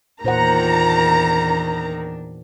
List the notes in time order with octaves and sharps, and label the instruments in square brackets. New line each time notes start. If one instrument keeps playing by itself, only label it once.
[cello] E2 D4 [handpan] A#2 C5 F#5 [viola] D#3 [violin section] A#5